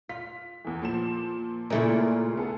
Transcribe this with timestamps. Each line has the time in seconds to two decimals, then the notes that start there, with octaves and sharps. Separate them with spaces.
0.09 F4 B6
0.65 E2 E3
0.82 A#2 F3 E7
1.70 A#2 C#3 G#3 A3 E4 G#4
2.37 B3 G#4 A4